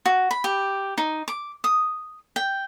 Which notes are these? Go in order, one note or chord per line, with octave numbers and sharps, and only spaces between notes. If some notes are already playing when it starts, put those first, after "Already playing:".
F#4
B5
G4
D#4
D6
D#6
G5